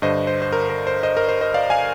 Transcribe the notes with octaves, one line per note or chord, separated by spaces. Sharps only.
G2 D3 C5 D#5
C5
C5
A#4
A#4
C5
C5 D#5
A#4
C5
C5 D#5
D5 F5
F5 G#5